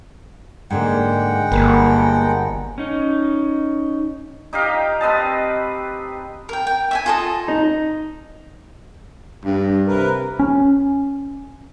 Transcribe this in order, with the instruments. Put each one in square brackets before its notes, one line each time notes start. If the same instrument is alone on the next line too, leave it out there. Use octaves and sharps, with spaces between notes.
[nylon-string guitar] G#2 D3 A#3 [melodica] G#3 F#5 G5
[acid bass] G1 [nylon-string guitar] A#3 A#4 B4
[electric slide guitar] C#4 D#4
[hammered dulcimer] D#4 G4 D#5 F5
C4 B4 D#5 A5
[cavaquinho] A#4 G5
G5
E5 G5 G#5
F4 A4 D#5
[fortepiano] D#4
[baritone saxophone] G2
[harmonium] C3 A#4 B4
[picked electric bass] C#4